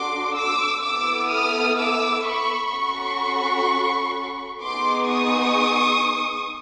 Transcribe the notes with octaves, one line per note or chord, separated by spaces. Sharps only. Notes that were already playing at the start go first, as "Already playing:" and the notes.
Already playing: D4 F#4 A4 C6 D6
D6 E6
B3 E4 A4 D6 E6
D#6 F6
D6 E6
B5 C#6
C#4 F#4 A4 B5 C#6
B3 D#4 G#4 C6 D6
C#6 D#6